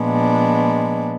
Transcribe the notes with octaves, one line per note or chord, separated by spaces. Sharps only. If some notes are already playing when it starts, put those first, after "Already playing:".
Already playing: A#2 F3 G#3 B3 D4